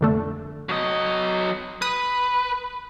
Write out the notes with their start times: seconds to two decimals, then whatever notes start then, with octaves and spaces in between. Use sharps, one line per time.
0.01 F2 D3 A3
0.69 F#3 D#5
1.82 B4 D#6